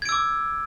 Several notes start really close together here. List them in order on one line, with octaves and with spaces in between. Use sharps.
G#6 D7 E6 D6